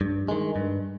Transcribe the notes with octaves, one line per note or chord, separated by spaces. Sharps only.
G2
D#3 G#3
G2